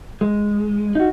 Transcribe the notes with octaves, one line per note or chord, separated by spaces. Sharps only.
G#3
D#4 F#4